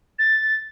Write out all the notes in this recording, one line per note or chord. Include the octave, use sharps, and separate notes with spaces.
A6